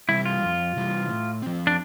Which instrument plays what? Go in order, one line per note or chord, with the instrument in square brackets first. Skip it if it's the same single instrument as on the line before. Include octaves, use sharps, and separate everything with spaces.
[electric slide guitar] C3 E3 G3 [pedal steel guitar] E4
[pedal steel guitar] F4
[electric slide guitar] F2
C3 E3 G3
A2
F3 C4
[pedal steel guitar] D4